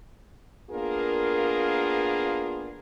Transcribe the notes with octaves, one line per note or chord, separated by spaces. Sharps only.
A#3 B3 D4 F4 G#4 A#4